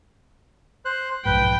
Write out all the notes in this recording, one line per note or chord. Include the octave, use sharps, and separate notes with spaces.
C5 F#6
B1 F2 G#2 B4 G5